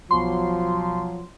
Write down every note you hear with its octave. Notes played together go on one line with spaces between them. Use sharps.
B1 F3 F#3 C6